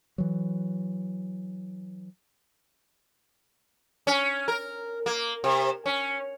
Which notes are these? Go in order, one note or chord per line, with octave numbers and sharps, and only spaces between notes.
E3 F#3
C#4
A#4
A#3
C3
C#4